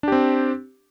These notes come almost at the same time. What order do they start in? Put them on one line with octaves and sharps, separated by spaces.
D4 G4 C4